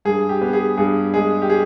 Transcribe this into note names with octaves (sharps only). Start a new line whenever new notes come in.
G2 G#4
G4
B3
G#4
G2 G#4
G#3 G#4
G4
G#4